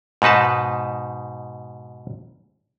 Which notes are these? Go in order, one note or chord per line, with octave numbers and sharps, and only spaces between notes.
G#2 B2 D#4 B4 A5